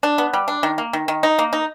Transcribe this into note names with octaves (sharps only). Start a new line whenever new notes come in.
D4
B3
G3
D4
D#3
A#3
D#3
D#3
D#4
A#3
D#4